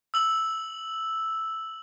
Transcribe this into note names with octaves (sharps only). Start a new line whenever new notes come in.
E6 F#7